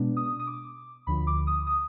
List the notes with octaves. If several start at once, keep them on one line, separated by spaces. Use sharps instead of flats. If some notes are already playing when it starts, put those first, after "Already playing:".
Already playing: B2 G#3 B3 D4
D#6
D#6
D6
D2 D3 F3 B5
D6
D#6
D#6